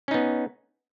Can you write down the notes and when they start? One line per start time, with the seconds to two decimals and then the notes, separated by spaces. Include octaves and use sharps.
0.08 C#4
0.11 D#4
0.14 B3